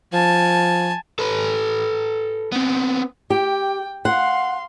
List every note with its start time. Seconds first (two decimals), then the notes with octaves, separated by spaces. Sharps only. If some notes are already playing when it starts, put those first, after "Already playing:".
0.13 F3 G#5 A5
1.19 A4 B4
2.52 B3 C4
3.30 G4 G5
4.05 F5 F#5 C6